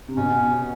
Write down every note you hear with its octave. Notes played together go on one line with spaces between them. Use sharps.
C3
B2 C#4